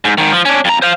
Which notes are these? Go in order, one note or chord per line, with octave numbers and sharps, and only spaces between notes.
G#2
G#2 D#3
F3
C#4 D4
F2 A#5
C5 F5